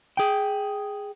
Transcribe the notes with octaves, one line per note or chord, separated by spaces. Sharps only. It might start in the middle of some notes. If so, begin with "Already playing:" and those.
G#4 G5